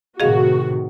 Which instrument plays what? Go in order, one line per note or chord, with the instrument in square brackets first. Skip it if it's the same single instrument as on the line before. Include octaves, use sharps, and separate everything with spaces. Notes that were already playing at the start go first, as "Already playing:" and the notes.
[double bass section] A2 C3 D#3 [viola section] F#4 [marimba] G#4 D#5 F5